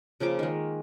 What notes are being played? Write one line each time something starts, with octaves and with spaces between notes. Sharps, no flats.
C#3 F3 A#3 D6
D#3 G#3